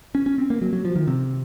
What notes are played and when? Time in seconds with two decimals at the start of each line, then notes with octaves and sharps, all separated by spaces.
0.15 C#4
0.26 C#4
0.38 C4
0.50 A#3
0.61 F#3
0.73 F#3
0.85 F3
0.96 D#3
1.07 C3